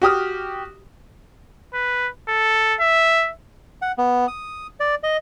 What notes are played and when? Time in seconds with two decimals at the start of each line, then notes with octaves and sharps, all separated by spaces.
0.02 F#4 G4 D#6 F6
1.74 B4
2.28 A4
2.80 E5
3.82 F#5
3.98 B3
4.28 D#6
4.80 D5
5.03 D#5